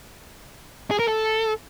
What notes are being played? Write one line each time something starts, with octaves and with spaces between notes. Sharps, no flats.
G#4
A#4
A4